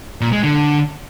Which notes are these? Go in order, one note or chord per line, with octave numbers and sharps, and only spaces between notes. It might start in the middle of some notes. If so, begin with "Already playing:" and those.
A#2
G#3
D3